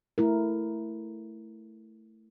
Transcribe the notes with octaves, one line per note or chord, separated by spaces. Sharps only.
A3 E4 A#4